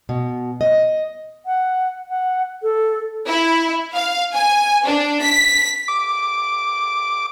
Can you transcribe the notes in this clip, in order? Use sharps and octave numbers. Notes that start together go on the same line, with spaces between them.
B2
D#5
F#5
F#5
A4
E4
F5
G#5
D4
B6
D6